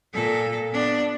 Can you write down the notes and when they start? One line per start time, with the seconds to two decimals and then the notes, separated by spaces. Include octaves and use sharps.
0.13 A#2 A4
0.71 B3 D4